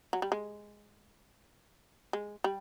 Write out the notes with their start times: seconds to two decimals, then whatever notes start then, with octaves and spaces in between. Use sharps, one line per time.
0.13 F#3
0.22 G3
0.32 G#3
2.13 G#3
2.44 G3